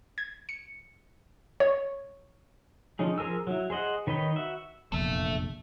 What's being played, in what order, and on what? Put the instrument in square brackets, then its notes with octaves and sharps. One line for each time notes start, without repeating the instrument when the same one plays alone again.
[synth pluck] G#6
C#7
C#5
[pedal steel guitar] D3 F3 C#4 D#4 G#4
F3 G#4 A#4 G#5 E6
F#3 E4
G#4 C5 D#5 F#5
D#3 B4 C#5 D#5 G5
F#4 E5
[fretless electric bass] F1 A#1 E2 [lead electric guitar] A4 E5